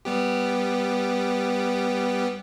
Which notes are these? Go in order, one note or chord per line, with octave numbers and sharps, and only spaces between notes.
G3 B3 G4